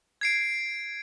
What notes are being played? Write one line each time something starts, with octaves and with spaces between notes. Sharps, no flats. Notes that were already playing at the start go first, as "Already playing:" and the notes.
G#6 C7 D7